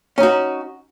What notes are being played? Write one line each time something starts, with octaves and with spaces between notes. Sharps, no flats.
C#4 D#4 F#4